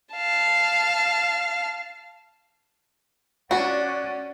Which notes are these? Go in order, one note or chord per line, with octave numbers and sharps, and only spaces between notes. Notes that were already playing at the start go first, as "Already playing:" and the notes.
F5 A5
C#4 D4 F#4 D5 F#5